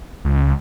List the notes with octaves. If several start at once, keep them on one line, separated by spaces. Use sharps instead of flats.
C#2